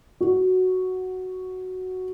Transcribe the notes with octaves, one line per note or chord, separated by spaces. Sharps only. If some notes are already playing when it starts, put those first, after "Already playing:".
F#4